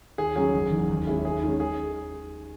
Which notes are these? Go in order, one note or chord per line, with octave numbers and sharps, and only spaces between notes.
D#2 G#4
C#3 F#3 C#4 G#4
F#1
E2 D#3
D#2
D#3 G#3 C#4 E4
D#2 G#4
D#3 G#3 C#4
G#4